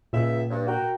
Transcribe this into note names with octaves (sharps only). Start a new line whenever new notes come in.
C#2 A#2 E5
G2
F#4 A#4 G5